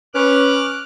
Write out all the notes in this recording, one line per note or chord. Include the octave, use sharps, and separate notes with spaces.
C#4 B4 D6 F6 F#6